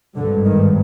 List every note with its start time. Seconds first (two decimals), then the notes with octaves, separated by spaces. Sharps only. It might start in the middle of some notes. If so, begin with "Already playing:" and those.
0.16 G#1 G2 D3
0.45 D#3